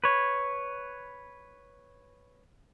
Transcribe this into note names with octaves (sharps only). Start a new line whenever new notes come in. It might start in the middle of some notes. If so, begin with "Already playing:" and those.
B4 C#5